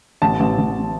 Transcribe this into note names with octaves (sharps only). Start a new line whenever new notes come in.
A1 A5
A1
A1